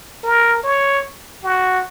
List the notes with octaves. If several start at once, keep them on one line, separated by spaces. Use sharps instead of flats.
A#4
C#5
F#4